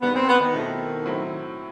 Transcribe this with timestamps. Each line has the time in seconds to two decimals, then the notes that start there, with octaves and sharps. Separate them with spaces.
0.02 E2 D#3 G3 B3
0.15 C4
0.28 B3
0.41 D#3
0.54 B2 A3 C4 E4
1.06 A2 F#3 C4 E4